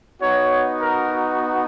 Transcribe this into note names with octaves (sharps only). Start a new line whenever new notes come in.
B3 D#4 F#4 C#5
A#4